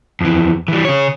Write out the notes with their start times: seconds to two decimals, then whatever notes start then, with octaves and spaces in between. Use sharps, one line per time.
0.21 F2 E3
0.68 E3 G3
0.85 C#3 C#5